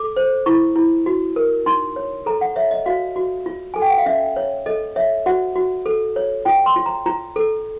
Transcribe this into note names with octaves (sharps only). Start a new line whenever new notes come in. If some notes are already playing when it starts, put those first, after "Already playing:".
Already playing: A4 D6
C5
E4 C#6
E4
F#4
A#4
D#4 C6
C#5
A4 A#5
F#5
C#5 E5
D#5
F#4 F5
F#4
F4
A4 G#5
G5
F#5
F5
C#4 E5
C#5
A4 D#5
C#5 E5
F#4 F#5
F#4
A4
C#5
F4 G5
C6
F4
A#5
F4 A#5
A4